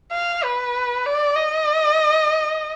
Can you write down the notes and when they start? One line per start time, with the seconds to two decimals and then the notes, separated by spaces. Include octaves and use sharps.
0.12 F5
0.44 B4
1.06 D5
1.36 D#5